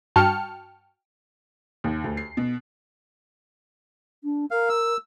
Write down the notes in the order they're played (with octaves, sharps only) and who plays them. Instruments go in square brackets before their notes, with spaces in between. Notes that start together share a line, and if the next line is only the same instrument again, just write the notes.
[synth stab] G2 F#4 G5 A5 F6 C#7
[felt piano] D#2
D2
C7
B2
[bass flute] D4
[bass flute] A#4 [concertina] F5
[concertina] E6